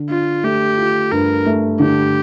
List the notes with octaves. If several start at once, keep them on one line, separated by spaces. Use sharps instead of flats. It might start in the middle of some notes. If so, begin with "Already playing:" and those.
Already playing: D3
D4 F4
A3 G4
F4
G2 A#4
A3
D3 G4